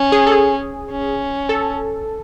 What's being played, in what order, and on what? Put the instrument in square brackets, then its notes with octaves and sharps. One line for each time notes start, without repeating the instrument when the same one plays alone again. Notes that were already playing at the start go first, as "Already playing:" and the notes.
Already playing: [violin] C#4
[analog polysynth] G#4
A4
G#4
[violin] C#4
[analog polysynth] A4